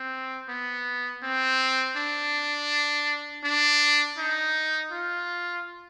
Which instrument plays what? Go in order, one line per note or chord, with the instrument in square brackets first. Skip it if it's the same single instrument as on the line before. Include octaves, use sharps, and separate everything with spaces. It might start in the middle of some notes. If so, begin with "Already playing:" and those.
Already playing: [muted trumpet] C4
B3
C4
D4
D4
D#4
F4